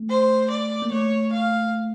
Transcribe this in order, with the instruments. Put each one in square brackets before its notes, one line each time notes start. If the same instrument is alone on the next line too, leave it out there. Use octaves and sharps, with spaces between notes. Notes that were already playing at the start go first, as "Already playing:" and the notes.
Already playing: [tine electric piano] A3
[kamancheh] C5
D5
[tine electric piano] A#3
[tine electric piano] A3 [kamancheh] C#5
[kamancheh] F5